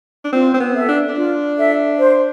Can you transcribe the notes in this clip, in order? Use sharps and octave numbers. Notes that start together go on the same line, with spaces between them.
D4
C4 F4
C4
B3
A4 E5
D4
D4
F4
A4 E5
C5